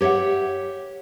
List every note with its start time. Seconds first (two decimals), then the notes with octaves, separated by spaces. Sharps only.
0.01 G4 C#5 D#5 E5 F#5